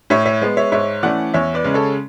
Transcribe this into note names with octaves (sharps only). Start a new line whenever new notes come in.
A2 C#5 E5
C#5 E5
G#3 B3
C#5 E5
G#2 C#5 E5
E3 A3 C#4 D5 F#5
E2 C#5 E5
B4 D5
C#3 G#3 C#4
A4 C#5